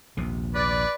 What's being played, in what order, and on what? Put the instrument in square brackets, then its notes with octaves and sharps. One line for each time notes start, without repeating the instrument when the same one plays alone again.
[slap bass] A#1 D#2 C3
[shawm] B4 [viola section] D5